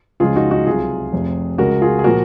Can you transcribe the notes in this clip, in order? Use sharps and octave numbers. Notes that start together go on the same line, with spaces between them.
C#2 C#3 F3 G#3 F4 G#4
D#4 F#4
D#4 F#4
C2 C3 F#3 F4 G#4
F1 F2 C3
C#2 C#3 G#3 F#4 A#4
F4 G#4
G#4
A#2 F3 F#4 A#4